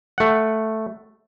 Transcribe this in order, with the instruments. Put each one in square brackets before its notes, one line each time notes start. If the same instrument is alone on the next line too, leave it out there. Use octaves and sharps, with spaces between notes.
[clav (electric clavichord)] A3 F#5